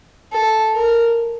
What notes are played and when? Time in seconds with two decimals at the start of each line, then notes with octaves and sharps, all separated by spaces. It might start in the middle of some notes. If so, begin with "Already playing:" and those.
0.33 A4
0.73 A#4